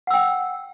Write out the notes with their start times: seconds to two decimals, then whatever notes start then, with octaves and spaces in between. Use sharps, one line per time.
0.07 F#5
0.10 E6
0.14 G5